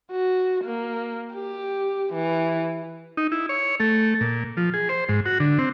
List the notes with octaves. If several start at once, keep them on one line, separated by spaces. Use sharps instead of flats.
F#4
A#3
G4
E3
D#4
E4
C#5
A3
A#2
F3
G#4
C5
G#2
F#4
D3
C4